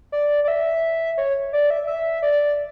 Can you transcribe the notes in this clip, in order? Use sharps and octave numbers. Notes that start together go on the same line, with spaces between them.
D5
D5
E5
C#5
D5
E5
E5
D5